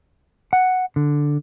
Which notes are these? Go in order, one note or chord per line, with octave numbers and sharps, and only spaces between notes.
F#5
D3